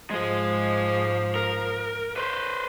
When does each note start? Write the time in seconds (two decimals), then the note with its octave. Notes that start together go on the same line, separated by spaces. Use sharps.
0.10 G#2 F3 G#3 G#4
1.36 A#4
2.16 B4 C5